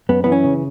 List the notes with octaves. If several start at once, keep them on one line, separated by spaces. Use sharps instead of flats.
F#2 B3
E3 B3
C#4
C#3